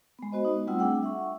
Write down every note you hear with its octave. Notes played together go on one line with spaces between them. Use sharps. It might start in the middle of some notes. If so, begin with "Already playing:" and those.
G#3 B3
B3 F#4 C5 D#5
D#4
G3 A3 C4 F4 F#5 E6
A3 D4 G#4 F#5 G5 E6
E5 F#5 C#6